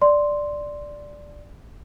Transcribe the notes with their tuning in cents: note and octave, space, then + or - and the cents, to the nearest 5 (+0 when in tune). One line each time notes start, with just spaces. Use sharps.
D5 +0 C6 +0